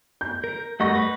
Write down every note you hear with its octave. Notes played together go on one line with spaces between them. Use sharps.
G6
A#4
G3 A3 D#5 F#5 C#6 A#6
B4